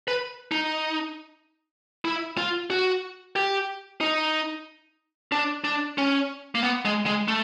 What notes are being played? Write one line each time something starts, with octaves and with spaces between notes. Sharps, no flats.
B4
D#4
E4
F4
F#4
G4
D#4
D4
D4
C#4
A#3
B3
G#3
G#3
A3